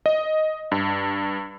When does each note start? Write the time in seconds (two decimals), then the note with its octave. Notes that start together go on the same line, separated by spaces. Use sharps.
0.06 D#5
0.72 G2